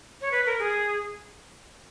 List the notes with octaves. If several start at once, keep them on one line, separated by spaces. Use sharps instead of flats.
C#5
B4
A#4
G#4